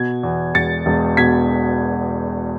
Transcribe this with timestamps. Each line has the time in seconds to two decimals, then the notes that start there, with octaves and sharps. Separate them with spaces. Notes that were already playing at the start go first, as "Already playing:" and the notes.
Already playing: B2 G#6
0.23 E2
0.54 E1 A6 C#7
0.86 E1
1.17 B2 G#6 B6